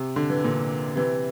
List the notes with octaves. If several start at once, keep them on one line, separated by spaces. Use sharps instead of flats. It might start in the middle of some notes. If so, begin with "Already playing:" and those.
Already playing: C3
D3
E3
A#2 D3
C3 E3